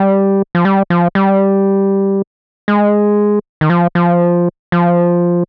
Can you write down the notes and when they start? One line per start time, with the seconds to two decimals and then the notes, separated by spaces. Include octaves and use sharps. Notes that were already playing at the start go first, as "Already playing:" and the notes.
Already playing: G3
0.55 F3
0.65 G3
0.90 F3
1.15 G3
2.68 G#3
3.61 D#3
3.70 F3
3.95 F3
4.72 F3